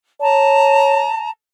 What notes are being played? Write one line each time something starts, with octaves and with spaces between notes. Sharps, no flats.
C#5 A5 A#5